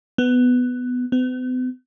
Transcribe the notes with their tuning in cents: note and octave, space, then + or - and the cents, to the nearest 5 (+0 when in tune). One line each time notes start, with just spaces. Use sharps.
B3 +10
B3 +45